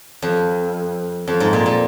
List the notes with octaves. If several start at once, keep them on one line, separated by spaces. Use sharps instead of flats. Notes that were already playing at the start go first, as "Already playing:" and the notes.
F2
F2
G#2
A#2
A#2